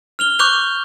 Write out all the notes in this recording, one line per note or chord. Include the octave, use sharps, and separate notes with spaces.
F6 F7 G7
C#6 D6 F#6 G6 F7 G7